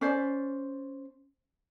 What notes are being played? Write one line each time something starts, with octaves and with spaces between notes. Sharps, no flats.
C#4 C5 D5